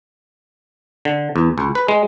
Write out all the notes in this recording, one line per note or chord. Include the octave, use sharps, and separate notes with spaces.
D3
E2
C#2
B4
G#3